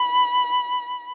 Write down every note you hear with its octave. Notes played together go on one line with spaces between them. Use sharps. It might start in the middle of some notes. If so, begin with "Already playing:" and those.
Already playing: B5